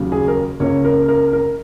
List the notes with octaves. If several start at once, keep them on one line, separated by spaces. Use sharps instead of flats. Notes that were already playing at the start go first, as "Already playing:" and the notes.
Already playing: D#2 C#3 F#3
G#4
A#4
C#2 C#3 A#3 C#5
A#4
A#4
A#4